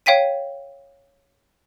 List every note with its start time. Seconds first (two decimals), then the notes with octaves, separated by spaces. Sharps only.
0.06 C#5 F5 G5 B6 D#7